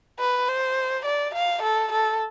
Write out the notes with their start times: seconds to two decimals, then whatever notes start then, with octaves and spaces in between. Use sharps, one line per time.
0.19 B4
0.49 C5
1.05 D5
1.34 F5
1.62 A4
1.92 A4